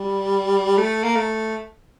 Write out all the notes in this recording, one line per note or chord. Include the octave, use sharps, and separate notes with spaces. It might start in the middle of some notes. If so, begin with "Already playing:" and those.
Already playing: G3
A3
A#3
A3